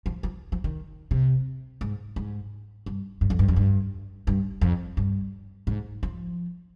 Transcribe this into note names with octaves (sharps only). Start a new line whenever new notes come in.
F3
F3
F3
D#3
C3
G#2
G#2
G2
G2
F2
G2
F2
G2
G2
F2
G2
G#2
F3